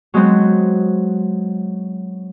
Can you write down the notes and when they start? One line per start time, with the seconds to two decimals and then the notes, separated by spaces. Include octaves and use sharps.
0.14 F#3 G#3 B3 C4